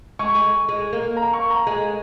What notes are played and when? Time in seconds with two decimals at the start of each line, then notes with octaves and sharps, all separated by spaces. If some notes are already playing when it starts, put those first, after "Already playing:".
0.19 G#3 C#6
0.35 G#3
0.69 G#3
0.93 A#3
1.17 A#5
1.33 C#6
1.50 A#5
1.67 G#3